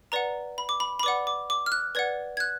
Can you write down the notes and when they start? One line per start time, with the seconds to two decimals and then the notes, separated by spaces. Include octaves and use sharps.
0.12 B4 D5 F#5 A#5
0.58 B5
0.69 D6
0.80 B5
1.00 B5
1.03 B4 D5 F#5 D6
1.27 D6
1.50 D6
1.66 F6
1.72 F#6
1.95 B4 D5 F#5 G#6
2.37 G#6
2.40 F#6